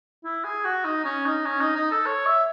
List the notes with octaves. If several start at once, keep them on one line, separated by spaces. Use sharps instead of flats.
E4
G#4
F#4
D#4
C#4
D#4
C#4
D#4
D#4
A4
C#5
E5